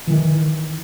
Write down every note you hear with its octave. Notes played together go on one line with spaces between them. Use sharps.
D#3 E3